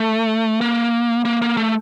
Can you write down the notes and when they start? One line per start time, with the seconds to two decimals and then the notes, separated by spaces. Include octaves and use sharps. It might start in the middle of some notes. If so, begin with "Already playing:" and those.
Already playing: A3
0.61 A#3
1.25 A#3
1.42 A#3
1.57 A3